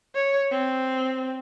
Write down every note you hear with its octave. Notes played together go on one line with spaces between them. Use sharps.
C#5
C4